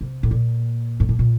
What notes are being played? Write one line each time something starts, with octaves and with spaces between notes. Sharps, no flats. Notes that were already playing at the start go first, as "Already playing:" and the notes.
C3
A2
A#2
G#2
A2
A#2